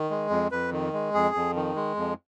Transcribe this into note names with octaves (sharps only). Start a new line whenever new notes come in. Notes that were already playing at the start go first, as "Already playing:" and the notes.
Already playing: D#3
G#3
F2
F2 B4
D#3
G#3
F2 G#4
F2
D#3
G#3
F2